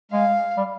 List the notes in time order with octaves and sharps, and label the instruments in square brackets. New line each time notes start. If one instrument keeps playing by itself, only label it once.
[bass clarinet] G#3 [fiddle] F5
[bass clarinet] G3